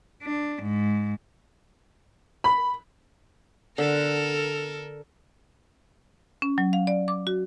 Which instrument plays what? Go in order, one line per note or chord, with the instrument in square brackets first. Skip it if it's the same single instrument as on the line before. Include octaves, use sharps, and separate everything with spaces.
[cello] D4
G#2
[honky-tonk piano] B5
[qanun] D3 [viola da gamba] A4 A#4
[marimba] C#4
F#3
F5
D5
D6
F#4